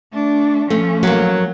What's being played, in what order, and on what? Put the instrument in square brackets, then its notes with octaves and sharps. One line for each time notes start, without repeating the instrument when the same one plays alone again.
[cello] A3 D4
[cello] F3 C#4 [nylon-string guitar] A3
[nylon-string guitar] F#3 A#3